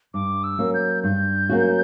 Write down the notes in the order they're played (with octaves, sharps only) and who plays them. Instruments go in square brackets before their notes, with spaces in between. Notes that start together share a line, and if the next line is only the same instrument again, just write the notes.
[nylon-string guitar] G2 [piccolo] D6
[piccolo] E6
[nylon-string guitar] F#3 A#3 C#4 F#4
[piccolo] G6
[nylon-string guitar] G2 [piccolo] G6
[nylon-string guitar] F#3 A#3 C#4 F#4